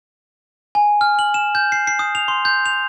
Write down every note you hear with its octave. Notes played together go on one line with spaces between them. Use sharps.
G#5
F6
F#7
E7
G6
C7
C7
D#6
F7
C6
G6
F7